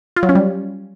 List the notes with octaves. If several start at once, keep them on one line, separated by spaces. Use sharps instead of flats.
F4
F#3
C#4
G3